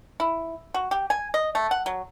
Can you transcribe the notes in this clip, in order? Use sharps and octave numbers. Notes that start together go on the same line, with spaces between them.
E4
F#4
G4
G#5
D#5
A3
F#5
F#3